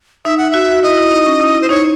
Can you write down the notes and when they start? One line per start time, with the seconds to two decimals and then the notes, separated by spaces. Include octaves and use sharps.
0.25 D#4 E5
0.38 F#5
0.51 F#4 E5
0.68 F#4
0.83 E4 D#5
0.98 E4
1.11 D#4
1.26 C#4
1.40 E4
1.55 E4
1.61 C5
1.69 D#4 C#5